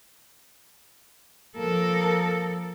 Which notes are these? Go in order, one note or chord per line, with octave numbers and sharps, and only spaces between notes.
F3 A#3 A4 A#4